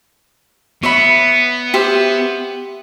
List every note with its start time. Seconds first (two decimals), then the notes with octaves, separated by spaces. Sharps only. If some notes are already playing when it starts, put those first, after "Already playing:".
0.83 B3 C#5 E5 B5
1.74 G4 C5 E5